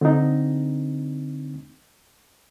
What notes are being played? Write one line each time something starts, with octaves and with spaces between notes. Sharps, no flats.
D3 C4 D4 D#4